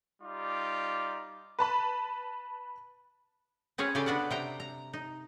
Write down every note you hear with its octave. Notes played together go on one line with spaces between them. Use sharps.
G3 D#4 F4 D6
B4 A5 B5
C4 C#4 G#4 B4 C#5
C#3 G4 A4 D5 G#5
B3 D4 F#4 D5 F#5
C3 G5 A#5
A#5
D#4